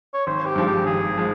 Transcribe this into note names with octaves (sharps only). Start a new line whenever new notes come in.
C#5
G#1 C5
G4
G2 F3 G#3
G4
G#1 G#4
F3 G#3